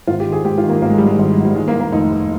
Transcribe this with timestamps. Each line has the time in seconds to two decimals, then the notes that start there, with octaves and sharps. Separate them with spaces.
0.07 G#1 F4
0.20 G4
0.27 D#3
0.32 G#4
0.44 G#2 G4
0.58 F4
0.63 D#3
0.69 A#3
0.82 G#1 A#3
0.90 G#3
0.98 G#2 G3
1.07 G#3
1.19 G#1
1.37 G#2
1.45 G3
1.56 D#3 G#3
1.68 A#3
1.74 D#2
1.80 A#3
1.92 F1 D#4
2.11 D#2